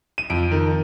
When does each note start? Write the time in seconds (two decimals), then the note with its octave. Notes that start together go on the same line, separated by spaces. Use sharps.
0.18 D#7
0.30 F2 D7
0.51 D#3